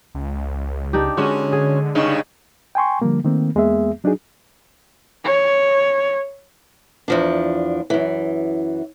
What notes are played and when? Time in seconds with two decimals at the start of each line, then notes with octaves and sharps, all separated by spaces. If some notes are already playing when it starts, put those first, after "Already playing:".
0.15 C#2
0.93 D4 D#4 G4
1.17 D3 G#3 C#4 F#4
1.52 G#4
1.95 G2 C#3 D#4
2.75 G5 G#5 C6 C#6
3.02 D3 F3 G3 A#3
3.24 D#3 A3 A#3 C4
3.55 E2 G#3 A#3 B3 G#4 E5
4.04 F#3 D4 D#4 F#4 G#4
5.24 C#5
7.08 E2 F3 D4
7.90 F#2 E3